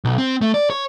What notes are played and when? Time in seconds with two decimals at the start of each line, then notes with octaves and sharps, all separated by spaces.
0.05 B1
0.18 C4
0.41 A3
0.54 D5
0.70 C#5